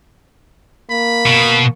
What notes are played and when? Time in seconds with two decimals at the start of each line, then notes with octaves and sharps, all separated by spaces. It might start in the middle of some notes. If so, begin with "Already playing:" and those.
0.90 A#3 B5
1.26 B2